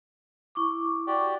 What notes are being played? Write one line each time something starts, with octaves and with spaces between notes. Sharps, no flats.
E4 C#6 D6
F#4 G4 D5